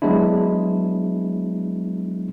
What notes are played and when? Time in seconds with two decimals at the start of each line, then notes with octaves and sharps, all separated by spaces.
0.02 F#3 G#3 B3 D4 E4